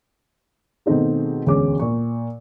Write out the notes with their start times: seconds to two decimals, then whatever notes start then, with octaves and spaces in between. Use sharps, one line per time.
0.86 B2 D#3 A3 C4 D#4 G#4
1.46 E1 D2 G#3 C#4 C#5 D6
1.80 A#2 C#6